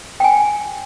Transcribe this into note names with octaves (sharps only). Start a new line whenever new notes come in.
G5 G#5